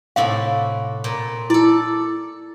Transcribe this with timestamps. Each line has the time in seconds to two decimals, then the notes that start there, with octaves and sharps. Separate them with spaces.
0.16 A2 C3 F#4 F5
1.04 A#2
1.50 E4 A4 D5